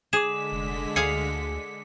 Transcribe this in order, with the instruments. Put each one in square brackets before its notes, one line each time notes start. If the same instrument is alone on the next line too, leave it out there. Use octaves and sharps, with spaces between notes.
[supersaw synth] D3 G#3 B6 [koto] G#4 [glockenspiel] D6 E7
[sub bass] F1
[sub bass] D2 [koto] G#4 F5 [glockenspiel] C#7